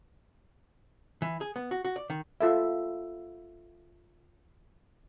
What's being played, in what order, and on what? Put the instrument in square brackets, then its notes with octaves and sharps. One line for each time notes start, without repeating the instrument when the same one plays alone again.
[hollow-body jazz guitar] E3
G#4
B3
F#4
F#4
D5
D#3
[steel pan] F4 A4 E5